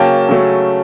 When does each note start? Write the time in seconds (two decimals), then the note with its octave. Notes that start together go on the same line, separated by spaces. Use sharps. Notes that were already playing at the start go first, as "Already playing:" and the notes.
Already playing: C#3 F#3 A#3 C#4 G5 A5
0.29 C#3 F#3 A3 C#4